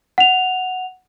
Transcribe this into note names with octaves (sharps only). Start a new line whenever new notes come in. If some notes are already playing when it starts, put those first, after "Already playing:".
F#5 F7